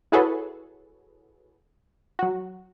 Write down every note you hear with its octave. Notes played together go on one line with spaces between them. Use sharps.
E4 F#4 G#4 A4 B4 C#5
F#3 F#4